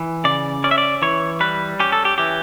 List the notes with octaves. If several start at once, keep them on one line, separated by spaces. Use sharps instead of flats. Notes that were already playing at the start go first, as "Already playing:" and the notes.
Already playing: E3
C#3 D5
C#4 D5
E5
D5
E3 C#5
G3 B4
C#4 G4
A4
G4
E3 G4